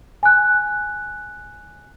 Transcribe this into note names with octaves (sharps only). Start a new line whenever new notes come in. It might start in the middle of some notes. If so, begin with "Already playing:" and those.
G#5 F#6